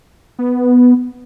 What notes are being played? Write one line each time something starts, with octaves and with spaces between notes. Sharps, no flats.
B3